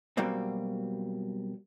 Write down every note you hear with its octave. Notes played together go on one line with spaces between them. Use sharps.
B2 F#3 G3 A#3 C4